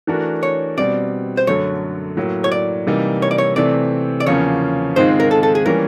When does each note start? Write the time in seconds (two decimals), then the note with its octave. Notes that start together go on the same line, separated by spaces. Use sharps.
0.07 E3 A3 D4 F#4 A#4
0.43 C#5
0.77 B2 G3 C4 D5
1.37 C5
1.47 F#2 D3 F#3 A3 C#5
2.17 A2 F#3 A#3
2.44 C#5
2.52 D5
2.87 C3 E3 G3 A#3 D#4
3.22 C#5
3.31 D5
3.38 C#5
3.56 C3 E3 A3 C4 D5
4.20 D5
4.26 E2 C#3 F3 A#3 C#4 C#5
4.96 G#2 D#3 G#3 C4 F4 C5
5.20 A#4
5.31 A4
5.43 A4
5.55 G#4
5.66 E3 G3 A#3 C#4 A#4